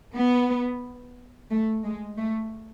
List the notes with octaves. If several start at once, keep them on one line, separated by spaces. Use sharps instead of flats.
B3
A3
G#3
A3